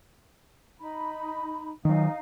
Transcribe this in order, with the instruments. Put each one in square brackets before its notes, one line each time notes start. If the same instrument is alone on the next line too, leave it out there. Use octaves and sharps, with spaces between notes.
[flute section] D#4 B5
[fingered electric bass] D#3 F#3 [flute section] D#4 F5